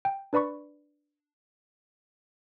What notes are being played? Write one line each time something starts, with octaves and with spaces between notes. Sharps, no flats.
G5
D4 B4 D5 B5 C#6